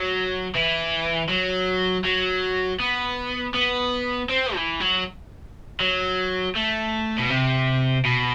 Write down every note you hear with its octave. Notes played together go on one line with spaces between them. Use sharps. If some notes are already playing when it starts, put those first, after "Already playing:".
Already playing: F#3
E3
F#3
F#3
B3
B3
C4
E3
F#3
F#3
A3
B2
C3
B2